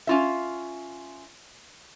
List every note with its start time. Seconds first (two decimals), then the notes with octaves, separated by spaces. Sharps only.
0.07 C#4 F4 E5